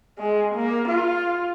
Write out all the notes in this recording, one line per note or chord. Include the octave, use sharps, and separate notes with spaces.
G#3
A#3
F4